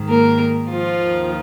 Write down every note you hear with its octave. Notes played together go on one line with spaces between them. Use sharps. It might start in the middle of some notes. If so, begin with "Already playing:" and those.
Already playing: G#2 D#3
A#3 A#4
F3 F4
D#2 D#3